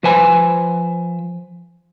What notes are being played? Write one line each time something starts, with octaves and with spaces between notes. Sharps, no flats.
F3 B4 C5 G#5 A5 B5